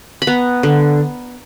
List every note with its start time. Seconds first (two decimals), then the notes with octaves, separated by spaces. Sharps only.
0.22 B5
0.27 B3 A#5
0.63 D3